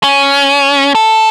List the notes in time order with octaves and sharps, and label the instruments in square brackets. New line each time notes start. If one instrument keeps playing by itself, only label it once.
[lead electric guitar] C#4
A4